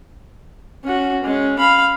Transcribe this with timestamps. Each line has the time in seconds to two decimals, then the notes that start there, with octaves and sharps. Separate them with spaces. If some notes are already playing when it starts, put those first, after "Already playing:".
0.84 C#4 F#4
1.24 G#3 C#4
1.59 F5 B5